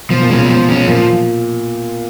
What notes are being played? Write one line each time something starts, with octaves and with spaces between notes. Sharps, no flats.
B2 F3
A#2
B2 G#3 C#4
F3
G#3 C#4
A#2 F3